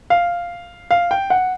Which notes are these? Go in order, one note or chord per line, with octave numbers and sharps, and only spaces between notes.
F5
F5
G5
F#5